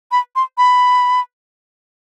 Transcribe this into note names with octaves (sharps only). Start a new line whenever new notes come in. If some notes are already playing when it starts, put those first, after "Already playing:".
B5
C6
B5